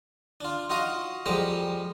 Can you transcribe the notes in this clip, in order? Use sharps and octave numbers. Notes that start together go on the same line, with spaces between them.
D4 F4
D#4 F4 F#4 D#5 F5
F2 G3 G#3 G4 A#5